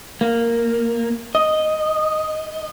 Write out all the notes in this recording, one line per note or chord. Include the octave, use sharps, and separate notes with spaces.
A#3
D#5